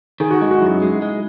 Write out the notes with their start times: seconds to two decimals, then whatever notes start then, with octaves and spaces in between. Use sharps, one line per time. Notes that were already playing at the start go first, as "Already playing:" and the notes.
0.20 D#3 G#4
0.31 F#4
0.41 G#3 D#4
0.51 F#4
0.59 E4
0.62 F#2
0.67 F#4
0.82 G#3
1.02 G#3